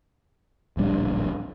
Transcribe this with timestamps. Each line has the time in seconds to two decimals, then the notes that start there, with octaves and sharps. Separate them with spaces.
0.77 D1 A#1 G3 D4